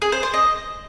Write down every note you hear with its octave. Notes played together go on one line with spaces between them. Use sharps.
G#4
C5
C5
D#5